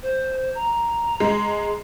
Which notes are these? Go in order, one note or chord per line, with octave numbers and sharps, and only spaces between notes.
C5
A#5
G#3